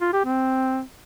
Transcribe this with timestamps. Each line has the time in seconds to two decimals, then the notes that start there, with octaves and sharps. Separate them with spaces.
0.01 F4
0.13 G4
0.25 C4